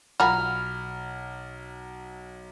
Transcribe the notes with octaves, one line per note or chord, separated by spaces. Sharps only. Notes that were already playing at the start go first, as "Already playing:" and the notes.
B1 F4 F#5 G#5 A#5 B5 F6